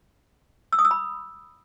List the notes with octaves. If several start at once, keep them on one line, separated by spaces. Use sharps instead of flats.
E6
D#6
E6
B5